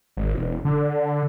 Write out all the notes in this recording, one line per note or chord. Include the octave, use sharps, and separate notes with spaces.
G#1
E1
D3